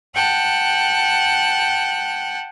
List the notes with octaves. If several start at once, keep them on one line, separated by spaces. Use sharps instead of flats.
F#5 G5 A5 F#6